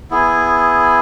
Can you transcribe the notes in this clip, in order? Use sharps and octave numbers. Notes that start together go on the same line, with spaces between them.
B3 E4 G#4